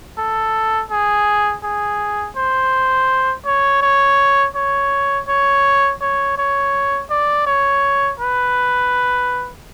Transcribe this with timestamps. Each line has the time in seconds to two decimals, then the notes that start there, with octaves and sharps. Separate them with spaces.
0.18 A4
0.91 G#4
1.63 G#4
2.36 C5
3.45 C#5
3.82 C#5
4.55 C#5
5.28 C#5
6.01 C#5
6.38 C#5
7.10 D5
7.47 C#5
8.20 B4